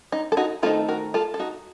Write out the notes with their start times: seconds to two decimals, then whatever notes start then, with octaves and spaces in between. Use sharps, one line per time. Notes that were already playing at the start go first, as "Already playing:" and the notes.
0.12 D#4
0.32 A4
0.37 D#4 F#4
0.62 D#3 A3 C4 D#4 F4 A4
0.88 F#4 A#4
1.14 F4 A4
1.34 A4
1.39 D#4 F#4